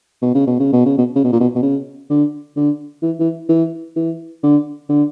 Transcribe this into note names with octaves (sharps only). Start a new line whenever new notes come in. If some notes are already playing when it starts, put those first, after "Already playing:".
B2
C#3
B2
C#3
B2
C#3
B2
C#3
B2
A#2
B2
B2
C#3
D3
D3
E3
E3
E3
E3
D3
D3